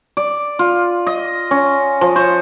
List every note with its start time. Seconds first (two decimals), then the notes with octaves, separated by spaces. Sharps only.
0.17 D5
0.59 F4
1.07 D#5
1.51 C#4
2.01 F3
2.16 C5 C#5